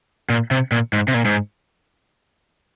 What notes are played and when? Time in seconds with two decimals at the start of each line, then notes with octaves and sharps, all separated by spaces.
0.30 A#2
0.51 C3
0.72 A#2
0.93 G#2
1.08 C3
1.14 A#2
1.25 G#2